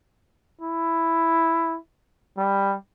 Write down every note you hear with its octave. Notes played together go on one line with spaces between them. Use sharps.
E4
G3